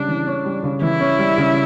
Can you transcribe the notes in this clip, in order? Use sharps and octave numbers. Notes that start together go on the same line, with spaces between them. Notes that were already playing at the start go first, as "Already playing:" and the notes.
Already playing: C#3 G3 D4
E3
C#4
G3
C#3
E3 E4
C#4
G3
C#3